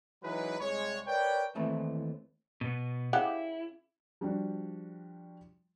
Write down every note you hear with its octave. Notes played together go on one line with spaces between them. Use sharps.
E3 F#3 G#3 D#4 B4
C2 G#3 C#5
A#4 B4 C#5 D5 G5
D#2 E3 A3 C4 E4 B4
B2 B3
C#3 E4 G4 F#5
F3 G3 D4 F#4